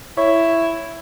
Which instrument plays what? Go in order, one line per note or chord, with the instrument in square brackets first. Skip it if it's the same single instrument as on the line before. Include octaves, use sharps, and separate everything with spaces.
[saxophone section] E4 [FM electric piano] C#5